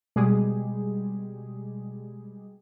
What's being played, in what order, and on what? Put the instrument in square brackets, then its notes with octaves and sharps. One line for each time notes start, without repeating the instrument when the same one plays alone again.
[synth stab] B2 G3 G#3 G4 G#4